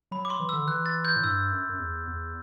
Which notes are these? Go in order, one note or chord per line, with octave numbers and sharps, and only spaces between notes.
F#3 B5
D6
C6
E3
E6
D3
E3 F#6
A6
G6
A2
G2 E6
F#2
F#2
E2
E2